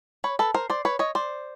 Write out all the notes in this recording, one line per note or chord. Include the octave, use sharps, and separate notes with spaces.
B4 C#5
A4 B4
A#4 C5
C5 D5
B4 C#5
C#5 D#5
C5 D5